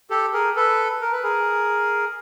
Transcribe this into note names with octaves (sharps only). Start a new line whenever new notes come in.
G4 A4
G#4 A#4
A4 B4
A#4
B4
G#4 A#4